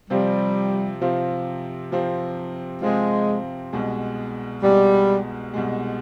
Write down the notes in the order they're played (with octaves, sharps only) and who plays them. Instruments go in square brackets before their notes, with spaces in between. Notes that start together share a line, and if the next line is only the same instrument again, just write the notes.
[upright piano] C3 F3 C4 F4 [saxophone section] G3
[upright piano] C3 F3 C4 F4
C3 F3 C4 F4
[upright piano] C3 F3 C4 F4 [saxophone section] G#3
[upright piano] C2 B2 G#3
[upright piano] C2 B2 G#3 [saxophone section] G3
[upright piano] C2 B2 G#3